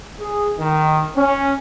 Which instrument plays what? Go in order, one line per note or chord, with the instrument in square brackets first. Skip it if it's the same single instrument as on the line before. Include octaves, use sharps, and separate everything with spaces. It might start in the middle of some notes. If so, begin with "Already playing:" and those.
[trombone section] G#4
D#3
C#4